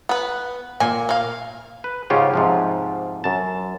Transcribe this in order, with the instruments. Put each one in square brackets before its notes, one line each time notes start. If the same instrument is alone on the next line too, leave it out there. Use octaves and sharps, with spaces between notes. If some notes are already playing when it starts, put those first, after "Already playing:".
[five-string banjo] B3 B4
[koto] A#2 [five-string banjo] G#5
[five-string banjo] A#3 F5
[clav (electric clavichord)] B4
G#2 C#3 C#4 F4 G4
G#2 C3 F3
F#2 A5